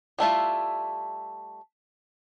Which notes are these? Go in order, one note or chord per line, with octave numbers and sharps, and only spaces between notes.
G3 A3 E4 F4